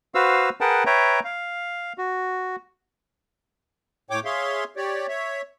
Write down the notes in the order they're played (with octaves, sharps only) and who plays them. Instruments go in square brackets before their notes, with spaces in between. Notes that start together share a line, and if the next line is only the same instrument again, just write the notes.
[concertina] F#4 B4 C5 F5 E6
G#4 A#4 B4 F#5 G5 A5
B4 C#5 E5 G5 A#5
F5
F#4
[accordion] A2 C#5 G5 D6
G#4 C#5 E5 F5 C6
G4 C#5 D5
C#5 E5